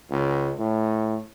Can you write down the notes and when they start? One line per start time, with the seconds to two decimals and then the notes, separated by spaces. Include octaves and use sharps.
0.11 C#2
0.59 A2